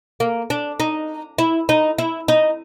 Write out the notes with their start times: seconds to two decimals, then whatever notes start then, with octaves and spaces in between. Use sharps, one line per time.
0.20 A#3
0.50 D4
0.80 D#4
1.38 E4
1.69 D#4
1.98 E4
2.28 D#4